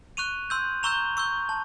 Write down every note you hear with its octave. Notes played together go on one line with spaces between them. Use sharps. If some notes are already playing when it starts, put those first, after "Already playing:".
C#6 F#6 D#7 F7
C6 E6 G6
A#5 C#6 E6 G6 F7 G7
C#6 E6 G6
A5